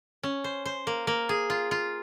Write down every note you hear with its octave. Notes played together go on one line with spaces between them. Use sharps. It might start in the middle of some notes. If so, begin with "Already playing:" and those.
C#4
C5
C5
A#3
A#3
G#4
F4
F4